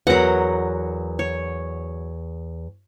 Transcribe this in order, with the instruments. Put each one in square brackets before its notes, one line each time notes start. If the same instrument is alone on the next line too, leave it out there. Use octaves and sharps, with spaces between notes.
[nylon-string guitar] E2 A#4 [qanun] F#3 F#5
[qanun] C#5